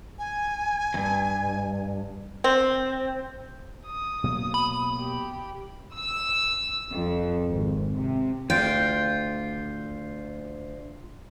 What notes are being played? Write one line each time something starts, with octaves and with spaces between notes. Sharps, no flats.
G#5
E2 G2
C4
D#6
B2 F#3 A#3
B5
G4
E6
F2
G#1
C3
D2 F4 G5